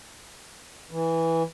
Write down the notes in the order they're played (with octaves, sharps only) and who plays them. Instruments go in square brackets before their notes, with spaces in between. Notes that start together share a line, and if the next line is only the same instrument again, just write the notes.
[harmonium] E3